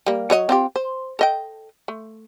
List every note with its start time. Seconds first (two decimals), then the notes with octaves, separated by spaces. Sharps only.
0.06 G3 A#3
0.30 F#3 C#5 D#5
0.49 C4 F4 G4
0.76 C5
1.19 A4 D#5 G5
1.88 A3